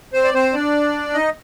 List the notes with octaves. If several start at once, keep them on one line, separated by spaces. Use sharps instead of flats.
C4 C5
D5
C4 C5
D4 D5
D#4 D#5